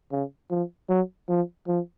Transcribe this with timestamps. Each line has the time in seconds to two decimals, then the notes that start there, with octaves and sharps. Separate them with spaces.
0.11 C#3
0.50 F3
0.89 F#3
1.29 F3
1.68 F3